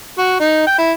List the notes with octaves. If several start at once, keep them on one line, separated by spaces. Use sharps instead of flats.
F#4
D#4
G5
E4